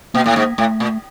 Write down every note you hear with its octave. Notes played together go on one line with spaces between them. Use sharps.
B2 A#3
A2
G#2
A2 A3
A#2